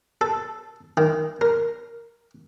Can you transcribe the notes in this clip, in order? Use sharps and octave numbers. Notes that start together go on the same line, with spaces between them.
A4
D#3
A#4